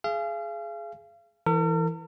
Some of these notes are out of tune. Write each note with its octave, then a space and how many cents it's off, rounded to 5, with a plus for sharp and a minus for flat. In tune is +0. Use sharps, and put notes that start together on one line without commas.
G#4 +15 F5 -35
E3 +0 A#4 -45